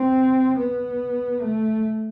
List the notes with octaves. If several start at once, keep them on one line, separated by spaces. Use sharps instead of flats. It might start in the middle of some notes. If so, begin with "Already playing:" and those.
Already playing: C4
B3
A3